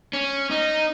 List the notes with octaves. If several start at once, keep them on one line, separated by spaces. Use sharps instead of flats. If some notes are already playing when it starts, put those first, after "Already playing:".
C#4
D#4